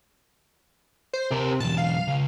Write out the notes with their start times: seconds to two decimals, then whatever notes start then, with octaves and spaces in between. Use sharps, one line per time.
1.13 C5
1.31 C3 G4 A#4
1.60 B1 E2 A5
1.78 F5
2.08 C#2